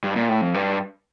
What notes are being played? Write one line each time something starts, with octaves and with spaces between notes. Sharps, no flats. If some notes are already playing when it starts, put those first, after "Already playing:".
G2
A#2
A2
F2
G2